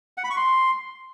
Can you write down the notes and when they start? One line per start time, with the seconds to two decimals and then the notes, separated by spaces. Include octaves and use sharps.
0.18 F#5
0.24 B5
0.30 C#6
0.37 C6